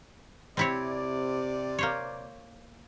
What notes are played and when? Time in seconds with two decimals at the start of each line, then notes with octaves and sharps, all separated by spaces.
0.57 C3 C4 E4 C#5 D5
1.79 A#3 C5 C#5